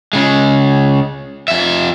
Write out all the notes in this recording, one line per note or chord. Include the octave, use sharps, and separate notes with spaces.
C#3 G#3
F2 E5